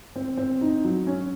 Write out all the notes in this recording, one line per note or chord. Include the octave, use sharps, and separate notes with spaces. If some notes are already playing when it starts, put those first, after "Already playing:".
C4
C4
D#4
F#3
C#4